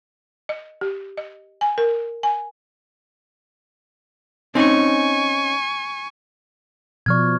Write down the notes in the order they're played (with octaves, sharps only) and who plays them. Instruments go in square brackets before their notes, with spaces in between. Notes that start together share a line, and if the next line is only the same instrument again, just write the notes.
[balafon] D#5
G4
D#5
G#5
A#4
G#5
[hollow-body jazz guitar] C4 C#4 D#4 [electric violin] G#5 C#6
[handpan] B2 F3 D5 [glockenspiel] C#6 F6 G#6